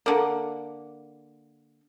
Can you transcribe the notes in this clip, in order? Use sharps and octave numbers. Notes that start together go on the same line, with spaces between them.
D3 A#3